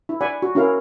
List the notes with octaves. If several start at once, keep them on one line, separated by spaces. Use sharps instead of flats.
E4
D5 F#5 G#5 B5
F#4
C#4 E4 F#4 A#4 F5